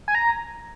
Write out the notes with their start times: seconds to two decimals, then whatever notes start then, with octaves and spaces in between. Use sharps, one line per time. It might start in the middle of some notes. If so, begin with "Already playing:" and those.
0.08 G#5
0.15 A#5